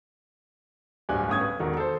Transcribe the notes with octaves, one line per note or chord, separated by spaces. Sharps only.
D1 G2 G#5 F#6
G1 A2 C#4 D#6 G#6
B4
E1 D#3 F#4 A4
A4 C5